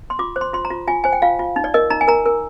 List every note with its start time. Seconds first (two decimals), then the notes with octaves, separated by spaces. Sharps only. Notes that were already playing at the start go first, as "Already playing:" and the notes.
0.10 C6
0.19 F4 D6
0.36 C5
0.41 C6
0.53 F4 C6
0.65 A#5
0.70 F4
0.87 F4 G#5
1.04 C5 G#5
1.12 G5
1.22 F4 F5
1.39 F4
1.56 D#4
1.64 D5
1.74 A#4 D#5
1.90 D#4 A#5
2.01 G#5
2.08 A#4 A#5
2.26 A#4